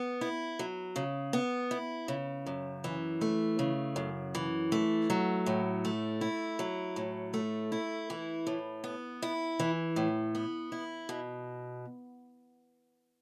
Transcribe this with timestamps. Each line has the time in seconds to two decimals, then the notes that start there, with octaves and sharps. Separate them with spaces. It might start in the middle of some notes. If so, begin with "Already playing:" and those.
Already playing: B3
0.21 E4
0.59 F#3
0.96 C#3
1.33 B3
1.71 E4
2.08 C#3
2.46 F#2
2.84 E3
3.21 A3
3.59 C#3
3.96 F#2
4.35 E3
4.72 A3
5.10 F#3
5.46 A2
5.85 A3
6.21 E4
6.59 F#3
6.96 A2
7.34 A3
7.72 E4
8.10 E3
8.47 A2
8.84 B3
9.22 E4
9.60 E3
9.96 A2
10.35 B3
10.72 E4
11.09 B2